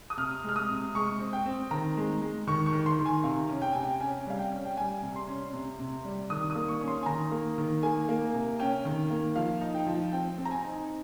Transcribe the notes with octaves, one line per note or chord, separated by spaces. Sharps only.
D#6
C3 F6
G#3 F6
D#6
C3
G#3 C#6
C4
G5
C4
D#3 A#5
G#3
G#3
D#3 C#6
C#6
D#3
C6
D#3
G#5
C3 F5
C#4
G5
C3 G#5
G5
C#4 G#5
G3 F5
G5
C#4
G5
G3 G#5
C3
C6
C#4
C3
C3
G3
D#3 D#6
D#6
A#3
C#6
C#4
C6
G#5
D#3 A#5
A#3
D#3
A#3 G#5
A#3
C3
C#4 G5
D#3
A#3
F3 F5
D#4
G5
F3
C4 G5
C4
A#5
G#5
D#4